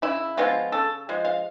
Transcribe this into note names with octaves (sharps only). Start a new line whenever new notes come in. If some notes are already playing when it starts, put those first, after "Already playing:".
C#3 E4
F3 G#3 B3 F4
C#3 A4
F3 G#3
F5